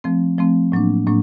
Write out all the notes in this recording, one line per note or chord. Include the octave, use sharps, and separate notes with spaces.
F3 A3 C4
F3 A3 C4
A2 F#3 A#3 D4
A2 F#3 A#3 D4